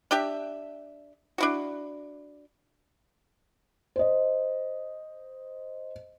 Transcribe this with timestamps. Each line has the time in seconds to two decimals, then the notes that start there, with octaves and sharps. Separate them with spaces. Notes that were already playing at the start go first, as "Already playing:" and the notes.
0.11 D4 G4 E5
1.38 D4 E4 F#4
3.96 C5 D#5